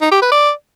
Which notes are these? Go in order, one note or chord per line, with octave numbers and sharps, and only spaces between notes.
D#4
G4
B4
D5